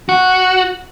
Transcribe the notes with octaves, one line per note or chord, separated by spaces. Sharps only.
F#4